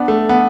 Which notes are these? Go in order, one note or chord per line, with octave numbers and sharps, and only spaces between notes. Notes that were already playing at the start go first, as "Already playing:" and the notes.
Already playing: B3 D4
A3
B3